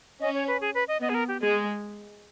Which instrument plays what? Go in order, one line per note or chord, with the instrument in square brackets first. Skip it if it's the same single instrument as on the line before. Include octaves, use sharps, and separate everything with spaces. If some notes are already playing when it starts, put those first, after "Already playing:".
[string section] C#4 [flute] D#5
[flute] C#5
B4
G#4
B4
D#5
[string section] B3 [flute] D#5
[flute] G#4
A#4
G4
[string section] G#3 [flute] G#4